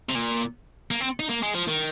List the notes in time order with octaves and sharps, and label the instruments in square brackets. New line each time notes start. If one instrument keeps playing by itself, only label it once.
[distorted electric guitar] C3
A#2
A#3
C4
D#4
A#3
G#3
F3
D#3